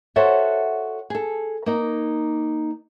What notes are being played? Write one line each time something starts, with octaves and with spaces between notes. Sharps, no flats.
F#4 A4 C5 C#5 E5 F#5
G#4 A4
A#3 D#4